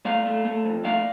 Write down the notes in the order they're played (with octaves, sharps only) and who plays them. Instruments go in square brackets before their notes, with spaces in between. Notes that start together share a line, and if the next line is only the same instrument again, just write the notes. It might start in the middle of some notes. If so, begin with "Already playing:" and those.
[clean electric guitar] A3 D5 F5
A3
A3
F2
A3 D5 F5